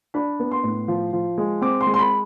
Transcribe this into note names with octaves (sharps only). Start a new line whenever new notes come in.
D4 B5
B3
C6
A2
F3
F3
G#3
C4 D6
C6
G#3
C6
B5